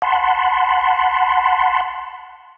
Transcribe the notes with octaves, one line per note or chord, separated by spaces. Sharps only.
F#5 A5 B5 C6